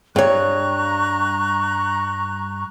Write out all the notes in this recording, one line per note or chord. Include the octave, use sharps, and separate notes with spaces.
G2 C#5 A#5 C#6 F#6